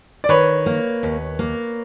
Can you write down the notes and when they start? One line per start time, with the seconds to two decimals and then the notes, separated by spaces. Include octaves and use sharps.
0.24 D5
0.29 D#3 B4 C#5
0.66 A#3
1.03 D#2
1.39 A#3